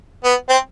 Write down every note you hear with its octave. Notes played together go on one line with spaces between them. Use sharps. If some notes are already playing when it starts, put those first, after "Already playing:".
B3
C4